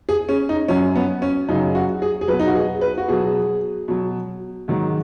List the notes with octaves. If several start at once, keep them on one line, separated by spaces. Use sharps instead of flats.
G#4
C#4
D#4
F#2 F#3 C#4
B3
C#4
F#2 C#3 F#3 D#4
F#4
G#4
G#4
B2 F#3 B4
D#4
F#4
G#4
B4
F#4
B2 F#3 G#4
B2 F#3
G#2 D#3 F#3